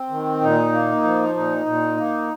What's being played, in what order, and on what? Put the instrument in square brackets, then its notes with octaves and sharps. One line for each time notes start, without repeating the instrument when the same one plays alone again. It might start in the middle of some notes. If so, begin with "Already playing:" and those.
Already playing: [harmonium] C4
D#3
A#2 D#4
A#3
F3
A#2 D#4
A#2
A#3